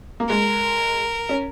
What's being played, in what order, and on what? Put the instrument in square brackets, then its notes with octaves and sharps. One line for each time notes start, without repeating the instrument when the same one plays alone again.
[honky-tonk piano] A#3
[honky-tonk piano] G#3 [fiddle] A#4
[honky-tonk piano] C#4